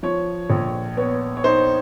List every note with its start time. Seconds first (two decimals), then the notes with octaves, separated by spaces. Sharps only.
0.03 F3 C#5
0.50 A#1
0.97 B3 C#5
1.37 C#5
1.44 D#4 C5